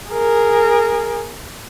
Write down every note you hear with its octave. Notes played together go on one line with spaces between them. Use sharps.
G#4 A#4